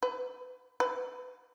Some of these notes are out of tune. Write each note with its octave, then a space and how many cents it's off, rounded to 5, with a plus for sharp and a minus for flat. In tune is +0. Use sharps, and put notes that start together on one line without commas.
B4 +35
B4 +25